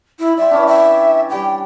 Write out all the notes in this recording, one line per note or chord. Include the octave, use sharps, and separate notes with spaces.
E4
D5 E5 G5 C6
E3 C#4 D4
E5 G5
G3 G4 G5